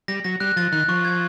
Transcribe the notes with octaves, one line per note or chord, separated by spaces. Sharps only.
G3 A#6
F#3 A#6
G3 F#6
F3 A6
D#3 F#6
F3 C#6
G#6